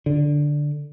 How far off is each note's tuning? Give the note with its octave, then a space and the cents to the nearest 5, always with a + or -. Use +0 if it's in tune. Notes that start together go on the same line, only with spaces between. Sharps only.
D3 +0